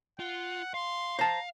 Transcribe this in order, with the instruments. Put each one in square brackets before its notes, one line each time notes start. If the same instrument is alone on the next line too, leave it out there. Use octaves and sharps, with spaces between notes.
[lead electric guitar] F4 [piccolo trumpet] F#5
[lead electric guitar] F5 [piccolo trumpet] C6
[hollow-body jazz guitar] C5 A5 [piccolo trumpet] A#5